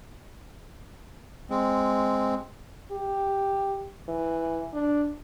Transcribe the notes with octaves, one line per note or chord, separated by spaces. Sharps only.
G#3 C4
G4
E3
D4